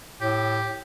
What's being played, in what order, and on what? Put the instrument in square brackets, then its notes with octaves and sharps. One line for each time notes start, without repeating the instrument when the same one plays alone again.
[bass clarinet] A2 [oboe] G4